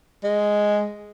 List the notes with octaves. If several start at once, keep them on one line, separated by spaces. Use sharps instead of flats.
G#3